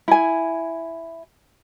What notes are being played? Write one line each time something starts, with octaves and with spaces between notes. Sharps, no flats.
E4 G#5